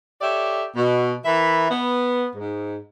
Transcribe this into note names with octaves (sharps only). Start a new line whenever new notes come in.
G4 A4 C#5 D5 E5
B2
E3 A#4 E5 B5
B3
G#2